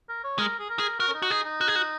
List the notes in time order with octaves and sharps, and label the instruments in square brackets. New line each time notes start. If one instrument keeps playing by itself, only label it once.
[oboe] A#4
C#5
[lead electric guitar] G#3 [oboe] A#4
[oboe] G#4
A#4
[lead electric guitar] G#4
[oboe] F#4 [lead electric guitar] A#4
[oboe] C#4
D#4
[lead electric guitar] F#4
[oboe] D#4 [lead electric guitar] G#4
[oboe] D#4
[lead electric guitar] F#4
G#4
F#4